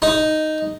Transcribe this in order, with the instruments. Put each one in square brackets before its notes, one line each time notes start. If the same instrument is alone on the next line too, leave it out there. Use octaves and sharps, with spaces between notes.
[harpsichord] D#4